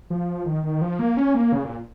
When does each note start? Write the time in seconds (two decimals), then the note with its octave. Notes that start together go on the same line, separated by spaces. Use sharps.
0.10 F3
0.46 D#3
0.63 D#3
0.82 F3
0.99 A#3
1.17 C#4
1.34 A#3
1.52 C#3
1.65 A#2